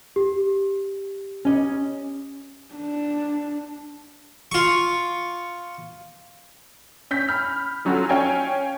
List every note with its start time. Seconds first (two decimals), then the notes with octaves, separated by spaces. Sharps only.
0.16 G4
1.45 C#4 D#5
2.74 D4
4.52 F4 C#6
7.11 C#4 G6 B6
7.29 B5 F6
7.85 F3 F#3 C#4 F4 F#4 A4
8.09 C#4 C#5 F5 G5 G#5